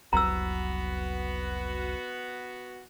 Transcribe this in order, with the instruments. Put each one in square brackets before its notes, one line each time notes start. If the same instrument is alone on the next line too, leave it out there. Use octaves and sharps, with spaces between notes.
[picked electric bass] F1 C2 F#3 [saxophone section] B3 F#4 [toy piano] A#5 E6